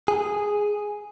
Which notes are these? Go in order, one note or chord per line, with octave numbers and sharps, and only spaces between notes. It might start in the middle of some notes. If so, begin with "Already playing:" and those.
G#4